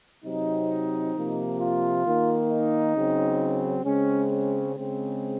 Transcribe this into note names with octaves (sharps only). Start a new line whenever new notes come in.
C3 F#3 C4 D#4
C3 F3 A#3
F4
D#3 A#3
D#4
C#3 F#3 C4
C#3 G#3 C4 C#4
C#4
C#3 G#3 C4